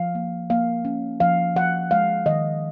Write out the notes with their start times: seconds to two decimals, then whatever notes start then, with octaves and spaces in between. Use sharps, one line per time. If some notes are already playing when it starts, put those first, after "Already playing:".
Already playing: F3 F5
0.15 A#3
0.50 A#3 F5
0.85 C#4
1.20 F3 F5
1.56 F3 F#5
1.91 G#3 F5
2.26 D#3 D#5